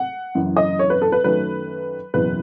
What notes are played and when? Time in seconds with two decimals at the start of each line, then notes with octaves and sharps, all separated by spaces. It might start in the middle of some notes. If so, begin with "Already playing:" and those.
Already playing: F#5
0.35 F#1 F#2 E3
0.57 D#5
0.79 C#5
0.90 B4
1.02 A4
1.12 B4
1.24 F#2 D#3 F#3 A3 B4
2.14 F#1 E2 B2 B4